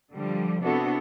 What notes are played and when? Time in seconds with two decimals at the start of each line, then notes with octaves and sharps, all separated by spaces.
0.12 D3 F3 G3
0.64 C3 B3 D4 E4 F#4 A4